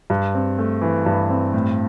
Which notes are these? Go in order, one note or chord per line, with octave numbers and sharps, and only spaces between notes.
G2
C4
A3
E3
G2
C4
A2